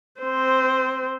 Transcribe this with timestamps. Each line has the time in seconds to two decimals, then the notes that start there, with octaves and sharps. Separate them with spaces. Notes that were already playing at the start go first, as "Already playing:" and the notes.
0.21 C4 C5